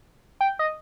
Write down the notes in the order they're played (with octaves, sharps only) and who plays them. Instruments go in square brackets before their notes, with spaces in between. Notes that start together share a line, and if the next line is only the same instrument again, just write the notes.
[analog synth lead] G5
D#5